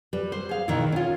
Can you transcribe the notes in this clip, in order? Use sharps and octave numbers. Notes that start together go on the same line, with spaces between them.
G3 B4
C5
G#4 F5
B2 D#3 E4
C#4 F4